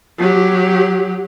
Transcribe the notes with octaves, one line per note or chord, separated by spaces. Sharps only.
F#3 G4